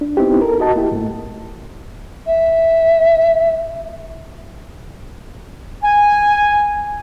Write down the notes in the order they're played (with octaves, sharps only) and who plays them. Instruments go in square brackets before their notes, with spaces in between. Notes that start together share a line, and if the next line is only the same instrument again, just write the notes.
[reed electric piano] D4
B3 C4 D#4 E4 G4
A4 A#4
F#4 D#5 A5
A#3 E4 G4
G#2 A3
[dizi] E5
[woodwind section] G#5